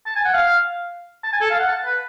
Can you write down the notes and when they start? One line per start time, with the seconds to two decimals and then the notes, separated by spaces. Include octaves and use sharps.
0.06 A5
0.16 G#5
0.25 F#5
0.34 F5
1.24 A5
1.33 G#5
1.41 A4
1.50 F5
1.59 F#5
1.69 A5
1.86 B4